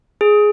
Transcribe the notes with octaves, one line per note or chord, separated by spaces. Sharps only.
G#4